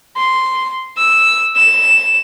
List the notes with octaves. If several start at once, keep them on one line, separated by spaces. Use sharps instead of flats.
C6
E6
E7